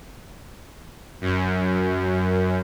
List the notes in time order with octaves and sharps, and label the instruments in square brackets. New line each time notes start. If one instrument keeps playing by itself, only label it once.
[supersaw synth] F#2